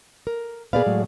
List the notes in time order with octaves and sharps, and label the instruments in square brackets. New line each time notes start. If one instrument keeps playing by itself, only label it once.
[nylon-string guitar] A#4
[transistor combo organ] A#2 B3 B4 [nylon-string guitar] G#4 D5 F5
[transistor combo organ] A2 F#3 G#3